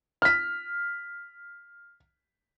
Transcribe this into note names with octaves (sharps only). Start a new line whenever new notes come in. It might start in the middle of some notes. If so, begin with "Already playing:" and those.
F6 B6